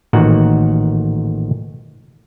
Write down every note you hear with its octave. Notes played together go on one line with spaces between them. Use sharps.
A1 A#2 D#3 F#4 F#5